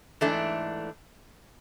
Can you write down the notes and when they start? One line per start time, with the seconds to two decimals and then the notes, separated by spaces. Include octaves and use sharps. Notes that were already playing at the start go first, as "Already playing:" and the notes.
0.21 G#2 E3 A3 D4